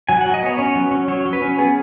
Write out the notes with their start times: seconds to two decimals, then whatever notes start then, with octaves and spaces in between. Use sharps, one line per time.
0.09 F#3 G#5
0.21 F#5
0.26 F#3
0.34 D#5
0.43 B3 C#5
0.58 C#4 C#5
0.75 F#3
0.91 C#4
1.08 F#3 C#5
1.26 F#3
1.33 B4
1.42 C#4
1.59 B3 G#4